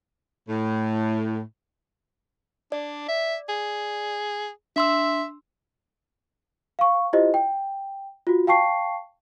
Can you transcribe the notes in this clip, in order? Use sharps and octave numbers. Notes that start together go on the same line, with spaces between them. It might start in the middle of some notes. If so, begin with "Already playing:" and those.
A2
D4 D5
E5
G#4
D4 E5 C6 E6
F5 C#6
E4 F4 G4 C5 D#5
G5
F4 F#4
F5 G5 A5 C#6 C7